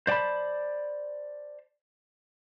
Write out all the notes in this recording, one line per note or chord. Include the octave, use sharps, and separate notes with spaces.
C5 D5 G5 A5 B5